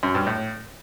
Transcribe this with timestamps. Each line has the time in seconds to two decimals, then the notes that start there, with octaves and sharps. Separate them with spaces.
0.03 F#2
0.15 G2
0.27 A2